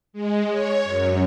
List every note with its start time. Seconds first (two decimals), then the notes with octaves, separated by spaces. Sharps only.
0.13 G#3
0.49 C#5
0.83 F#2